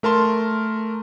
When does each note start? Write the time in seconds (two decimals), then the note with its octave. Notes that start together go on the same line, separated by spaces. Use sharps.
0.03 A3 A#4 A5 C6